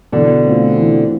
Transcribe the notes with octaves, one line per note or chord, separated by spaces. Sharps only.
B2 D3 E3
A3 C4 F4
E3